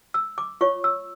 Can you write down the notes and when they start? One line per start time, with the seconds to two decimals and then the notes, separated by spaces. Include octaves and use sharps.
0.14 E6
0.38 D6
0.61 F4 C#5 C#6
0.84 E6